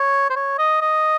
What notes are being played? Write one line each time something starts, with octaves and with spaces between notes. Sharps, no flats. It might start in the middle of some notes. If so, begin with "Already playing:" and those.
Already playing: C#5
C5
C#5
D#5
D#5